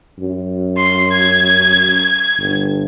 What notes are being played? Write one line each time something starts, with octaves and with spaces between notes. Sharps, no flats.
F#2
C6
G#6
G1